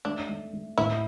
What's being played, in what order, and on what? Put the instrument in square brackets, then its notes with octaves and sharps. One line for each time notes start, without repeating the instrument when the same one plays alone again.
[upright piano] A3 [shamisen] D4
[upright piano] A3
A3
[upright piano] A2 [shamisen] E4